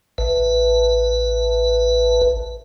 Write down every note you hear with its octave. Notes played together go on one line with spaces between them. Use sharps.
A1 B4